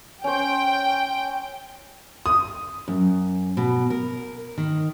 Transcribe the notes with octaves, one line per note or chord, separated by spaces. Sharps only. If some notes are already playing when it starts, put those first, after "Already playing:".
C#4 C5 G5
D#6
F#2
B2
A#4
D#3